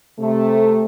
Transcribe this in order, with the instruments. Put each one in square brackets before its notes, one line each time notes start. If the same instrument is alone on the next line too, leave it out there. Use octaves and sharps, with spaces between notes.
[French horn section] C3 A3